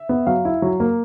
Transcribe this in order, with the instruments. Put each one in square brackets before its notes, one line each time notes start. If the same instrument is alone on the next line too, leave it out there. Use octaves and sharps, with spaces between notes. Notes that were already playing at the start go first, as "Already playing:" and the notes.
Already playing: [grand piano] E5
B3
F#3 F5
E4
F#3
A#3